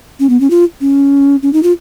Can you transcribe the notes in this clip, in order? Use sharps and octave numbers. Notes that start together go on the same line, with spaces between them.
C#4
B3
C#4
F4
C#4
C#4
D#4
F4